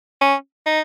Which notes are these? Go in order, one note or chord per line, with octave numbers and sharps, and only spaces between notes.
C#4
D#4